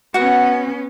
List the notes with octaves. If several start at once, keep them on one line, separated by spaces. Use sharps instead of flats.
B3 C#4 F#4 F#5